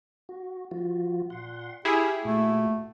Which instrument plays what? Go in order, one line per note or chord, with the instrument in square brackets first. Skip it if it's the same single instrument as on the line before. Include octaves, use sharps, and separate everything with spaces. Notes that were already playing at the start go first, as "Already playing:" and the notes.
[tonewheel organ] F#4
F3 F4 F#4
[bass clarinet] A#2 [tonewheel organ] F#5 C6
[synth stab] E4 G#4 [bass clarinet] G4 [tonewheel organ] B5 C6 F6
[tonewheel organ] A#2 F#4 [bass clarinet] A3